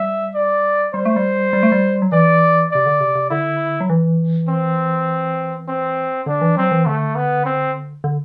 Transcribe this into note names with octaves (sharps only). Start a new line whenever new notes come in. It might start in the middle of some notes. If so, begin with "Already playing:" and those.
Already playing: G3 E5
D5
G3 C5
A3
G3
G3
A3
G3
F#3
E3 D5
C3 D5
D3
C3
C3
D3 E4
F#3
E3
C4
C4
D3 D4
E3
F#3 C4
E3
D3 A3
B3
C4
D3